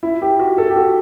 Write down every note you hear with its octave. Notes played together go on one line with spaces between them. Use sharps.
E4
G4
F#4
A4
G4
F#4